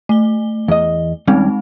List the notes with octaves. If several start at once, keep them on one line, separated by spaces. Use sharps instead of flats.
A3 G7
E2 D#5
D#2 G3 G#3 C4 C#4 D#4